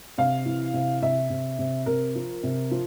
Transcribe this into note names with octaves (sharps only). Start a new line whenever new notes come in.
C3 F5
E3
C3
C3 E5
C3
C3
C3 A#4
F3
C3
F3